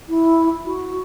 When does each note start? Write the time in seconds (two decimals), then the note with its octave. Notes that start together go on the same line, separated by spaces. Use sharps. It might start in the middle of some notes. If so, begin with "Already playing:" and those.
0.09 E4
0.65 F#4